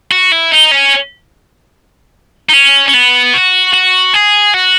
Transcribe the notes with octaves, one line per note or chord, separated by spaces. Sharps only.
F#4
E4
D#4
C#4
D#4
C#4
C#4
B3
F#4
F#4
G#4
F#4